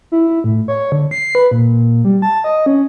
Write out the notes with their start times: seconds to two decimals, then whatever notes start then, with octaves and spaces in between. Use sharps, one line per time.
0.12 E4
0.44 A2
0.68 C#5
0.92 D3
1.11 C7
1.35 B4
1.51 A#2
2.05 G3
2.22 A5
2.44 D#5
2.66 C#4